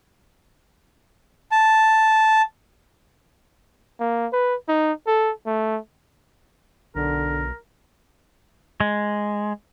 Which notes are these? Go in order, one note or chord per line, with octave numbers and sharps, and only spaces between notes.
A5
A#3
B4
D#4
A4
A3
B1 D3 A#4
G#3